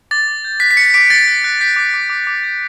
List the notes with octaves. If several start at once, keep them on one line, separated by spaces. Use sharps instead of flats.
D6 A6
D6
G6
F#6 B6
B6
F#6 A6 C#7
D6 B6 D7
F#6 A6 C#7
F#6
F#6
G6 B6
D6
D6
D6
D6
G6